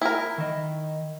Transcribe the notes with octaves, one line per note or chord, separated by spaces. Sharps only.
E4 A#4
D#3 D#5